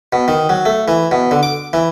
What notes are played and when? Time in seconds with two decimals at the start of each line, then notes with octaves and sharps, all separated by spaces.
0.13 B2
0.28 D#3
0.49 F#3
0.65 A3
0.88 E3
1.12 B2
1.31 D3
1.43 D6
1.73 E3